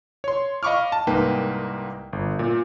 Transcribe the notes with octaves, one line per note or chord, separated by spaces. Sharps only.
C#5 C6
D#5 F5 B5 C#6 D6 F6
A5
C2 G#2 A#3 D#4 B4 G5
G1
A#2